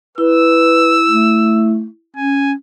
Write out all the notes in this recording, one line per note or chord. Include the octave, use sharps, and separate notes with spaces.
E4 B4 E6
A3
C#4 G#5